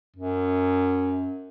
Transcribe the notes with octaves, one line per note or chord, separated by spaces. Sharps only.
F#2